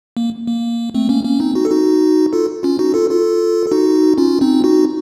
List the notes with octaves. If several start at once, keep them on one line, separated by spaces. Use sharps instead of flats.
A#3
A#3
A3 C4
A#3 C#4
A#3 C#4
C4 D#4
D#4 F#4
A4
D#4 F#4
F4 A4
C#4 F4
D#4 F#4
F4 A4
F4 A4
A4
D#4 F#4
C#4 F4
C4 D#4
D#4 F#4